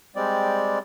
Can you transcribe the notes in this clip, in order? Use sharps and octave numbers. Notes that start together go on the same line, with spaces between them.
G3 G#3 C4 D5